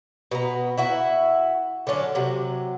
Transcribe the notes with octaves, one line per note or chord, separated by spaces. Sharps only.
B2 B3 A#5
E4 F#4 E5
D3 F#3 C#4 D4
C3 F#3